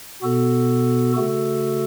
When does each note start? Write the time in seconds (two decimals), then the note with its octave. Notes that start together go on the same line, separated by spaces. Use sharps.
0.22 B2 B3 F#4 A4
1.16 C#3 A3 F#4 A4